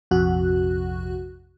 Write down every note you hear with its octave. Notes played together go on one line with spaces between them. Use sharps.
A#1 F2 C3 F#4 F#6